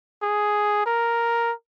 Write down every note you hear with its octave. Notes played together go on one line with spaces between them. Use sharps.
G#4
A#4